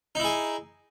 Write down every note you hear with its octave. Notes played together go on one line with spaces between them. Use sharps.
D#4 E4 G#4